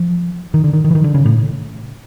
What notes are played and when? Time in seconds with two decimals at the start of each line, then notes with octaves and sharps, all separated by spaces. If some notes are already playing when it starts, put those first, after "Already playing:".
Already playing: F3
0.54 D#3
0.64 D3
0.73 D#3
0.84 D#3
0.91 E3
0.95 D#3
1.04 D3
1.14 C#3
1.26 A2